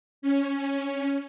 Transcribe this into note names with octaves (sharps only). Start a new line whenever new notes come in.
C#4